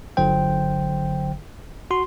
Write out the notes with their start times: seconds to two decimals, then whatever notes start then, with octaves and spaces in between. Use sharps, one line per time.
0.17 G1 D3 F#3 C5 G5
1.91 F#4 C6